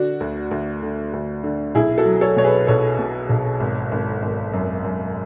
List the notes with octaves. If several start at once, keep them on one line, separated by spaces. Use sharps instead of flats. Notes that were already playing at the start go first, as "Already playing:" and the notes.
Already playing: D3 D4 F#4
D2
D2
D3
D2
D3
B1 E4 G#4
F#4 A4
F#3
A4 C#5
B2 C#5
G#4 B4
B1 A4 C#5
B2
B1
G#1
G#1
G#1
F#2
F#2